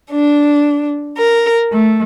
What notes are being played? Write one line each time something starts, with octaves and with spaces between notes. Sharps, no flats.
D4
A#4
A3